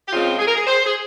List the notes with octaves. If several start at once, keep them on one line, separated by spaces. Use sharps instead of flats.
G4
C#3 F3 G#3 C4 F4
G#4
A#4
G#4
C5
G#4